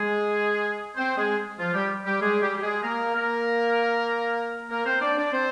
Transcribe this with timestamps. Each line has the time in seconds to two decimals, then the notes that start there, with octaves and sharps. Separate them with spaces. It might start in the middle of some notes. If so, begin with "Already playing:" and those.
Already playing: G#3 G#4
0.96 C4 C5
1.17 G#3 G#4
1.59 F3 F4
1.74 G3 G4
2.05 G3 G4
2.22 G#3 G#4
2.42 G3 G4
2.57 G4
2.62 G#3 G#4
2.83 A#3 A#4
3.14 A#3 A#4
4.70 A#3 A#4
4.86 C4 C5
5.02 D4 D5
5.17 D4 D5
5.33 C4 C5